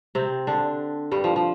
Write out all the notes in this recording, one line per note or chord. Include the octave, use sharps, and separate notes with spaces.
C3 C4
D3 D4
G2 G3
F3
F3